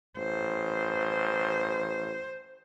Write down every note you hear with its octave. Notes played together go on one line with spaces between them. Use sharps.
A1 C5